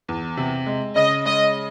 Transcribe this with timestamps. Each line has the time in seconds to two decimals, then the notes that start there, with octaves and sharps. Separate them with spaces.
0.09 E2
0.37 C3
0.66 G#3
0.96 C#3 D#5
1.25 G#3 D#5